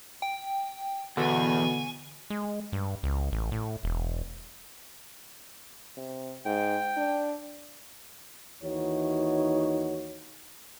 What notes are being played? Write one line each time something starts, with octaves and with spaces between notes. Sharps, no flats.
G5
E2 B2 D3 G#5 C#6
G#3
G2
C#2
A1
A2
E1
C3
G#2 G5
D4
D#2 E3 D#4 F#4 C#5